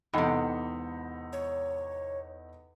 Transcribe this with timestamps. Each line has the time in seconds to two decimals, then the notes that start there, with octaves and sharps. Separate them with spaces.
0.14 E2 G#2 C3 D#4 A4 F#5 G5 B5
1.33 C#5